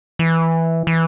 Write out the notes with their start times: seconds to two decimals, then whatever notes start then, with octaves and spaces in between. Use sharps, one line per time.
0.19 E3
0.87 E3